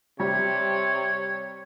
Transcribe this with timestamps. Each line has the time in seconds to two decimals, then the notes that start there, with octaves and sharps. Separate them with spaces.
0.20 C3 G3 C#5